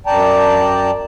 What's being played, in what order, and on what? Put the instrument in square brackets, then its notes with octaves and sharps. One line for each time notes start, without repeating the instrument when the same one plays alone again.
[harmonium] F#2 D5 G5 A5 A#5